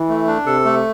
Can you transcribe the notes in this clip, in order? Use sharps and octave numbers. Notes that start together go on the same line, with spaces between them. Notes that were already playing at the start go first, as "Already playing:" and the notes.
Already playing: E3
A3
D4
C3 A4
A3